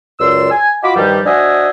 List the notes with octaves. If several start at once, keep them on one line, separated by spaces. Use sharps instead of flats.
C#2 F#2 D5 C6 E6
G#5
F4 F#4 D#5 B5 D6
G2 D#3 F3 G3
D4 F#4 C5 D#5 E5 G#5